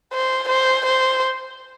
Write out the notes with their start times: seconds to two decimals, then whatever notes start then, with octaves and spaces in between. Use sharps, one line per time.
0.13 C5
0.48 C5
0.86 C5